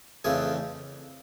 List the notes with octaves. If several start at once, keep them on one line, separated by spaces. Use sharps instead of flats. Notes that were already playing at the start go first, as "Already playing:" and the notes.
F2 C#3 E3 A3 C4 G#4 G#5